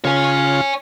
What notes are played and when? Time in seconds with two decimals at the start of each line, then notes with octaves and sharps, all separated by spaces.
0.05 C#3 F4 C#5 G#5